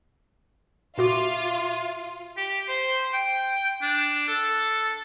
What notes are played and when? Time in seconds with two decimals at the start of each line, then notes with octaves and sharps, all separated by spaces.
0.98 A#2 F4 F#4 E5 C6 D6
2.37 G4
2.68 C5
3.14 G5
3.82 D4
4.28 A4